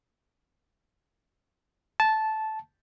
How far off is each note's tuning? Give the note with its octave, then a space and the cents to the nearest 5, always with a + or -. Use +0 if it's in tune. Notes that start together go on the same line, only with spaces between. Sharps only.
A5 -10